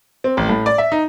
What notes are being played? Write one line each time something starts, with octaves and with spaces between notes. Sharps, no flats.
C4
A1
A2
D5
E5
D#4